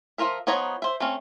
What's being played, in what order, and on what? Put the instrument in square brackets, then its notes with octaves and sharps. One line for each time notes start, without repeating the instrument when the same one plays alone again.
[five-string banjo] F3 D4 F4 A#4 E5
F3 B3 D#4 C#5 A#5
C5 E5
A3 C4 C#4